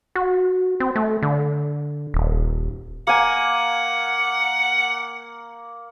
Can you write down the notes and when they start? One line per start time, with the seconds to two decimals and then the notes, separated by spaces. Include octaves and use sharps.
0.15 F#4
0.80 C4
0.95 A3
1.23 D3
2.14 D#1
3.07 A#3 F#5 G#5